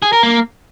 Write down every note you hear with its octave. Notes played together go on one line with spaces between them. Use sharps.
G#4
A#4
A#3